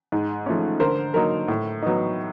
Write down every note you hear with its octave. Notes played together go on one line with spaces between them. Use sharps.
G#2
F3 A3 C#4
D3 A#4 C5
F#3 A#3 D#4 A#4
A2
F#3 B3 D#4